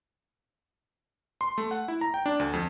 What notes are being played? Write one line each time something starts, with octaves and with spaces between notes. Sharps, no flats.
C6
A3
F#5
E4
A#5
G5
D4
D2
F2